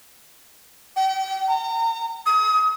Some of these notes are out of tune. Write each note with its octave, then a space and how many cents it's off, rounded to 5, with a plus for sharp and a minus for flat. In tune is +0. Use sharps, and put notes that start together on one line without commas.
G5 -35
A#5 -40
D#6 +35